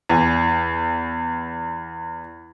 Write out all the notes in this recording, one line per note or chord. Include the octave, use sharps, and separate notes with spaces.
E2 G#5